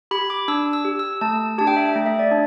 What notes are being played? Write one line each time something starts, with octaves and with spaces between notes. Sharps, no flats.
G4 B5
D6
D4 E6
E6
G4
E6
A3 A5
D4 G4 A5
G5
E5
G5
A3
E5
D5
D4